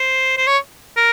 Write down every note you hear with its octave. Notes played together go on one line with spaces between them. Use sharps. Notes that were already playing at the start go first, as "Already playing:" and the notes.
Already playing: C5
C5
C#5
A#4